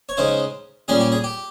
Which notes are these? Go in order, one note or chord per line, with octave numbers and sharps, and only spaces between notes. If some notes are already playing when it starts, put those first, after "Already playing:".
C#5
C#3 G#3 D#4 C5
A#2 G3 C#4 G#4
G4
G#4
G4